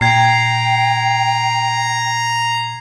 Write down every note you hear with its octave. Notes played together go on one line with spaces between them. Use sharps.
A#2 G5 A#5 G#6 C7